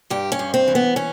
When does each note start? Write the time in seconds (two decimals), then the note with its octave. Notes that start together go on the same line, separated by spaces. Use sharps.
0.10 G2 G4
0.32 C#4
0.39 G2
0.54 C4
0.68 E3
0.75 B3
0.96 C#4